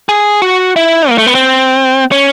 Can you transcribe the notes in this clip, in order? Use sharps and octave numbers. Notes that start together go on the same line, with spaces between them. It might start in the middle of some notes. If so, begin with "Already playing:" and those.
G#4
F#4
E4
A#3
A3
B3
C4
C#4